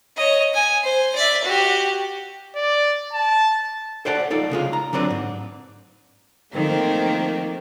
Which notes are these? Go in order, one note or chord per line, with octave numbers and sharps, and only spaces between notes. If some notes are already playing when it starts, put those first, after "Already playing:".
C#5 D#5
G#5
C5
D5 E5
F#4 G4
D5
A5
A4 C5 D5 F#5 A5
D#4 F4 A4 D5
C2 C#3 G#3 F4
A#5
D3 F#3 C4 D4 B4
G#2
D#3 F3 A3 A#3 C4